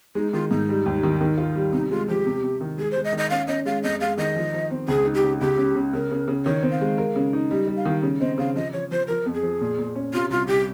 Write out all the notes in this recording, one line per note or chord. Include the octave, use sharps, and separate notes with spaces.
G#3 D#4
D#3 F4
G#2 D#4
G3
D#2
D#3
D#3
F4
G3
C3 D#4
G#3 F4
F3 G4
C3
C3
D#3
G#3 G#4
C5
G#3
D#5
D#3
D#5
C#4 F5
C#4 D#5
G#3 F5
F2 D#5
G#3 F5
D#3 D#5
F3
F3
C4
C#2 G#4
D#4
G4
C#3
C#2 G4
C#3
C#3
C#3 A#4
C#3
C#3
D#3 C#5
C4
F5
G#3
A#4
C#3
D#4
G3 D#5
G3
F5
D#3
C#3
C4 D#5
C#3 F5
F3 D#5
F3 C#5
F3 C5
F3 A#4
F2
G#4
F3
A#2
A#2
C#4
C3 F4
C2 F4
C2 G4